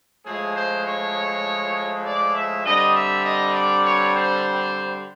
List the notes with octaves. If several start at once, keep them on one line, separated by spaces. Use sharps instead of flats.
A2 F3 G#3 G#4
C5
C#5
D5
E5
D3 G3 C4 D#5
E5
D#5
D5
C#5
C5